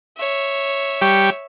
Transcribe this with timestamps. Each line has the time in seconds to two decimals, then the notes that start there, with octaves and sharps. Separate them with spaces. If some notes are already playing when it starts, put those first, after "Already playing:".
0.17 C#5 E5
1.02 G3 G4 C#6